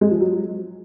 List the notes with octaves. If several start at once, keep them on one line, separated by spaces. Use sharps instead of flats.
G#3
F3
F#3